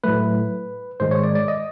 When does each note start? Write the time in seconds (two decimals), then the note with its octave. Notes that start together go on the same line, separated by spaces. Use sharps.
0.04 A2 F#3 A3 B4
1.00 G#2 D#3 G#3 C5
1.11 C#5
1.23 D5
1.35 D5
1.48 D#5